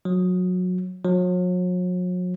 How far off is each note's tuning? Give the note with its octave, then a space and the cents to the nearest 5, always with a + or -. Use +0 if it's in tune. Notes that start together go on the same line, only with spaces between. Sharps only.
F#3 -25
F#3 -40